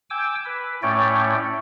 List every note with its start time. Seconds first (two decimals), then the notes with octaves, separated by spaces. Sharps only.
0.10 G5 G#5 D6 E6
0.45 B4
0.83 A2 A3 C#4 C#5 D5 G5